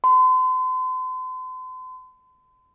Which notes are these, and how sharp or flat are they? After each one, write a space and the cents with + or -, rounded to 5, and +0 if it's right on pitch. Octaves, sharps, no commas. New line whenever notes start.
C6 -40